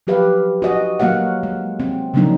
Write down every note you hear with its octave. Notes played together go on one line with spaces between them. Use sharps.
F3 F#3 G4 B4 F5
F#4 D#5
F#3 A#3 F#4 F5 F#5
G#3
C4
C#3 F3 F#3 A#3 D4 D#4